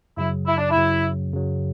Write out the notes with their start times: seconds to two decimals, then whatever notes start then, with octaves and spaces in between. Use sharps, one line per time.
0.17 F#2 C#3 F#3 E4
0.47 E4
0.58 D4
0.70 E4
0.75 F#2 C#3 F#3
1.32 F#2 C#3 F#3